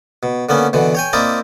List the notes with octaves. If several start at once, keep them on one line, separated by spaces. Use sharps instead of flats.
B2
D3 A#3 B3 C#4
B2 D3 E3
C#5 G5 G#5
A#3 C4 E4 A#4 D5 D#5